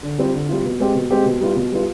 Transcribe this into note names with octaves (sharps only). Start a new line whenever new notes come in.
D3
G3 C4 F4
D3
G3 C4 F4
B2
G#3 C4 G4
B2
G#3 C4 G4
B2
G3 B3 F4
B2
G3 B3 F4